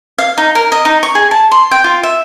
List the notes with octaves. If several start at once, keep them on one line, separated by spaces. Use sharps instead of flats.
F5
D#4
A#4
D#5
D#4
C#6
G#4
A5
C6
G5
F4
E5